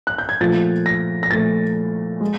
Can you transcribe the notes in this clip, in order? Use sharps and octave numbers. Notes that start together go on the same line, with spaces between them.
F#6
G6
G#6
A#2 F3 A3 A6
A#6
A#6
A#2 F3 A3 A6
G#3